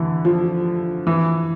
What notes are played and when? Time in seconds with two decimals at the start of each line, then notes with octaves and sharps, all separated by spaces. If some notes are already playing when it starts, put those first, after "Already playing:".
Already playing: D3 E3
0.25 F3
1.07 E3